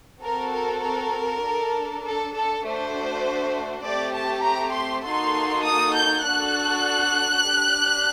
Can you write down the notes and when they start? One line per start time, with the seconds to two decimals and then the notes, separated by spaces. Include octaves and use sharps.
0.21 C4 F#4 A4 A#4
0.52 A#4
0.82 A#4
1.42 D4 A4
2.03 A4
2.33 A4
2.64 A3 D4 F#4 C5
3.85 A3 C4 G4 D5
4.15 A5
4.45 A#5
4.75 C6
5.05 A#3 D#4 F#4 A4 C6
5.66 D#6
5.96 G6
6.27 D4 F#4 A4 F#6
7.48 D4 G4